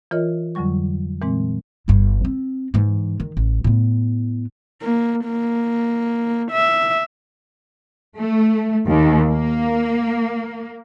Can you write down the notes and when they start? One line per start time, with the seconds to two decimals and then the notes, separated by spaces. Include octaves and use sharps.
0.11 E3 F4 A#4 C#5 D#5
0.55 F2 D3 F#3 G3 C#6
1.22 A#2 E3 G#3 C4
1.88 G1 G2
2.25 C4
2.74 G#2 E3
3.20 D#3
3.37 A1
3.64 A2 B3
4.82 A#3
5.25 A#3
6.51 E5
8.16 A3
8.85 D#2
9.31 A#3